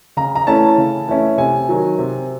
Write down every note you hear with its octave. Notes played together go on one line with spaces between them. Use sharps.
C#3 A#5
A#5
E3 A3 C#4 E4 A5
C#3
E3 A3 C#4 E4
C3 G#5
D#3 F#3
C3